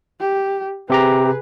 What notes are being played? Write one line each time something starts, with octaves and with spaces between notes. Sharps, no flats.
G4
C3 G4 G#4 B4 A#5